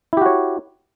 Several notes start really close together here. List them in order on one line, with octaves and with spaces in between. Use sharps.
E4 G4 F#4 C#5